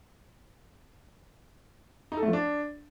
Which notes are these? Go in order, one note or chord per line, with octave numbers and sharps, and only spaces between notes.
D#4
A4
A3
F3
D4